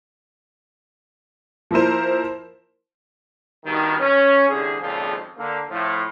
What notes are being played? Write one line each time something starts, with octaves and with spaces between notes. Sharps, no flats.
F3 A#3 E4 A#4 C5
G2 B2 D#3
C#4
C2 D3 G#4
G#1 F2 A#2 C#3 F3
D3 A#3
A2 F3